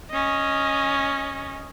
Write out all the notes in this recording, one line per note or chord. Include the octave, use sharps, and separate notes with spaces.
C#4 D#5